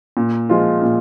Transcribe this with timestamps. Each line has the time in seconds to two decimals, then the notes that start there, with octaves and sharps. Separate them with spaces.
0.17 A#2
0.49 F3 G#3 F4
0.82 A#2